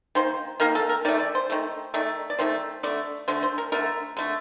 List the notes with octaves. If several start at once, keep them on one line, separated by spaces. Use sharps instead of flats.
D#3 A#3 C5
D#3 A#3 A#4
A4
A#4
D#3 A3 D5
D5
C5
D#3 A3
D#3 A3 D5
D5
D#3 A3 C5
D3 A3 D5
D3 A3 C5
C5
A#4
D3 A3 A#4
D3 A3